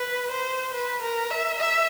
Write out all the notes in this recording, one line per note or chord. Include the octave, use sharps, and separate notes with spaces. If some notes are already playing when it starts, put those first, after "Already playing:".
Already playing: B4
C5
B4
A#4
E5
E5